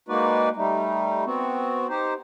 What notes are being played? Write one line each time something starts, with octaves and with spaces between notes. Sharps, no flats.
G#3 A#3 D#4 F#4 B4 D5
G3 A3 D#4
B3 C4 F#4
D#4 G4 C5